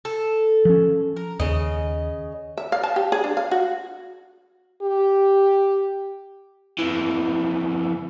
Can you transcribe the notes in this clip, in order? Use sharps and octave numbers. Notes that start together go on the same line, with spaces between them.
A4
F3 C#4
A#4
D#2 C#3 D#5
E5
F5
A5
G4
G#4
D4
F5
F#4
G4
F2 E3